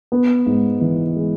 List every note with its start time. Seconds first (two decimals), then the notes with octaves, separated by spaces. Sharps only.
0.12 B3
0.46 G#2
0.81 E3
1.16 G#3